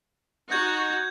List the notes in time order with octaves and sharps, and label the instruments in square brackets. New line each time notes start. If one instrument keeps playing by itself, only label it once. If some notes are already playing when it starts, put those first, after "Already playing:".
[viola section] D#4 F#4 [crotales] G6 G#6